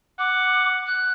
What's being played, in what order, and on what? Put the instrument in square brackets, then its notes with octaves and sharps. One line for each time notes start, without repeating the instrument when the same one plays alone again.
[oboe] F#5 [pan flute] D6
[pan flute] F#6